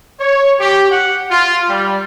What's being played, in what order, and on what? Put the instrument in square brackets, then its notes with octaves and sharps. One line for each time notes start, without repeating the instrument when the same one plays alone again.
[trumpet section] C#5
G4
F#5
F4
G3